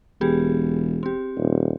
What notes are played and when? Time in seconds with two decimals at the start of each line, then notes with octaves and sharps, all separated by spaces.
0.21 E1 B3 G4 G#4
1.03 C4 G4
1.37 D#1